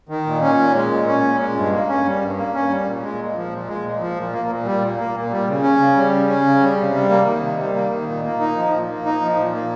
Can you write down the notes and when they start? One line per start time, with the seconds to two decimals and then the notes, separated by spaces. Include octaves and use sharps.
0.09 D#3
0.26 A#2
0.42 C#4
0.58 A#2
0.75 G#3
0.91 A#2
1.07 C#4
1.24 A#2
1.40 G#3
1.56 G2
1.72 A#3
1.89 C#4
2.05 G3
2.21 G2
2.37 A#3
2.54 C#4
2.69 G3
2.86 A#2
3.03 G#3
3.18 A#2
3.36 F3
3.51 A#2
3.67 G#3
3.84 A#2
4.00 F3
4.16 A#2
4.33 A#3
4.49 A#2
4.65 G3
4.81 A#2
4.97 A#3
5.14 A#2
5.31 G3
5.47 C#3
5.63 C#4
5.79 C#3
5.96 G3
6.11 C#3
6.28 C#4
6.45 C#3
6.60 G3
6.78 C3
6.93 G3
7.10 A#3
7.26 D#3
7.42 C3
7.59 G3
7.75 A#3
7.91 D#3
8.07 A#2
8.24 A#3
8.40 D#4
8.56 F3
8.73 A#2
8.89 A#3
9.05 D#4
9.22 F3
9.37 A#2
9.53 A#3